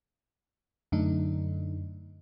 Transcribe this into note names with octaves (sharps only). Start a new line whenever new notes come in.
F#2 D3 A3 D4 D#4